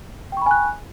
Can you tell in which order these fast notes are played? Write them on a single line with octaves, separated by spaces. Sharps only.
G5 C#6 B5 G#5 F#6